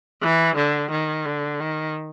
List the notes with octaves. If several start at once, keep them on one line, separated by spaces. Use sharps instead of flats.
E3
D3
D#3
D3
D#3